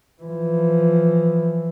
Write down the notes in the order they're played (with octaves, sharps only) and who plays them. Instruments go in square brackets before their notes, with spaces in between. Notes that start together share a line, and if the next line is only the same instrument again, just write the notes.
[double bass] E3 F3